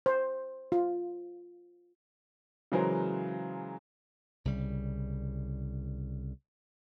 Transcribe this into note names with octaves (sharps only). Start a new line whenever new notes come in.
C5
F4
C#3 E3 F#3 G#3 A#4 C5
C2 C#3 G3